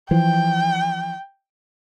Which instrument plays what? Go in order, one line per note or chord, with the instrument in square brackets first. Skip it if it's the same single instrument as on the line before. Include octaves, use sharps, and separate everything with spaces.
[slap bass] E3 F3 [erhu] G5